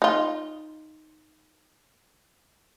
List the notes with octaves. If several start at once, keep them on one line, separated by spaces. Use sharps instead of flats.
D#4 F4